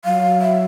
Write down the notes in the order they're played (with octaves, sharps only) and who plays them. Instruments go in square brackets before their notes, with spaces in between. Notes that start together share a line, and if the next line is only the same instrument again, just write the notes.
[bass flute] F#3 [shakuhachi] F5
[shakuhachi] E5